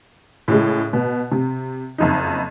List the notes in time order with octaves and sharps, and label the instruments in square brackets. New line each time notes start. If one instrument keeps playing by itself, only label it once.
[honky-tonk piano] A2 C#3 G#3
B2
C3
F#1 F2 D#4